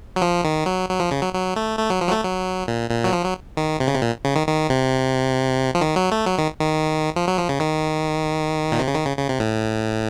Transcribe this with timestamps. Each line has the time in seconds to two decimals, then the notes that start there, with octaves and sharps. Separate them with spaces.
0.16 F#3
0.22 F3
0.44 D#3
0.66 F#3
0.89 F#3
1.00 F3
1.11 C#3
1.22 F#3
1.33 F#3
1.56 A3
1.79 A3
1.90 F#3
2.01 F3
2.08 F#3
2.12 A3
2.24 F#3
2.68 A#2
2.90 A#2
3.04 F#3
3.13 F3
3.23 F#3
3.57 D#3
3.80 C3
3.87 C#3
3.94 C3
4.02 A#2
4.25 C#3
4.36 D#3
4.47 D#3
4.70 C3
5.75 F3
5.81 D#3
5.96 F#3
6.12 A3
6.26 F#3
6.38 D#3
6.59 D#3
7.16 F3
7.28 F#3
7.38 F3
7.49 C#3
7.60 D#3
8.72 A#2
8.79 C3
8.88 C#3
8.95 D#3
9.06 C#3
9.17 C#3
9.29 C3
9.40 A2